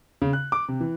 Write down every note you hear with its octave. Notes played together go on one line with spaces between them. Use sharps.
C#3
F#6
D6
C3
E3